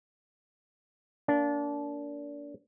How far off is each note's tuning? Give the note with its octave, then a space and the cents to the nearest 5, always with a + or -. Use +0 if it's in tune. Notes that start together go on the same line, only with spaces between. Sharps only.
A#3 +0 D4 -25